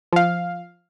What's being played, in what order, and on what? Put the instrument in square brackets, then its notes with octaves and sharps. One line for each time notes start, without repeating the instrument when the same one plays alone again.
[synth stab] F3 F5